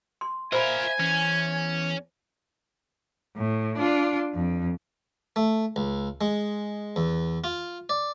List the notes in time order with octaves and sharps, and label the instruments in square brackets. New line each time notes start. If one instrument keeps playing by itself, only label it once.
[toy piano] C6
[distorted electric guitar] F4 A#4 [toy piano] C5 B5 [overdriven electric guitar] D#5 E5 [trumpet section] G#5
[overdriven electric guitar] E2 [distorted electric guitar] C#4
[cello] A2
D4 F4
F2
[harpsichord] A3
C#2
G#3
E2
F4
D5